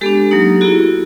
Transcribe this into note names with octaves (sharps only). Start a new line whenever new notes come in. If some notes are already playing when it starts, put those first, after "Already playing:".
G#3 B3 D4 G4 A4
F#3 A#3 D#4
B3 E4 F#4 G#4